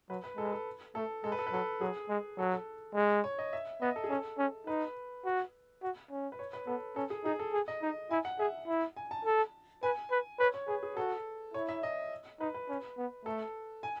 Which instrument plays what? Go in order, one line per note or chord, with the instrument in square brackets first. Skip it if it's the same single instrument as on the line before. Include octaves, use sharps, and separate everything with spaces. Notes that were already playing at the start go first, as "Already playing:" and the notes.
[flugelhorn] F#3 [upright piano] B4
[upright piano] B4
[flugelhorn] G#3 [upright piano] A4
[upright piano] B4
A4
[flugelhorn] A3 [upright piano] A4
[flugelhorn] G#3 [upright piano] A4
[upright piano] B4
A4
B4
[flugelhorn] F#3 [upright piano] A4
[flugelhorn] F#3 [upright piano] G#4
[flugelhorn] G#3
[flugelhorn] F#3 [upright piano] A4
[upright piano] A4
[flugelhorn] G#3
[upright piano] C#5
D#5
E5
[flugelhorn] B3 [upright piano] D#5
[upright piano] A4
G#4
[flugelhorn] C#4 [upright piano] A4
[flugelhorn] C#4
[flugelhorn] D#4 [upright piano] B4
[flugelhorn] F#4
F#4
C#4
[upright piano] B4
C#5
B4
[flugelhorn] B3 [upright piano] A4
[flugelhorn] C#4 [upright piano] A4
[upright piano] G#4
[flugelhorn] D#4 [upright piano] G#4
[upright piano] A4
[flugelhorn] G#4
[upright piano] D#5
[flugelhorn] D#4
[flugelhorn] E4 [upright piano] G#5
[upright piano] F#5
[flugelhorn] G#4 [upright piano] E5
[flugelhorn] E4
[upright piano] G#5
A5
[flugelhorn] A4
[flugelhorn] B4 [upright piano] G#5
[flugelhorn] B4
[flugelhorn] B4 [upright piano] C#5
[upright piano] C#5
[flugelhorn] G#4 [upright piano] B4
[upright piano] G#4
[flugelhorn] F#4 [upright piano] A4
[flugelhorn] E4 [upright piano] C#5
[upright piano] E5
D#5
[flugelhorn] D#4 [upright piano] B4
[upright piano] B4
[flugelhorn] C#4
B3
[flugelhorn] A3 [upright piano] A4
[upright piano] G#5